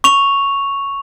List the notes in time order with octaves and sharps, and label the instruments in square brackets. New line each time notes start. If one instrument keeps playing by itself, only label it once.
[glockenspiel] C#6 F7